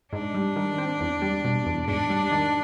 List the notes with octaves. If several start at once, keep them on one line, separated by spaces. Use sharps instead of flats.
G#2 D4
G3
D#3
C4
E2
G3
B2
E2
G#2 D4
G3
D#3